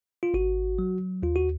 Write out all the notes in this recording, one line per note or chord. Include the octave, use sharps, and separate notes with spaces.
F4
G#1 F#4
F#3
D#2 F4
F#4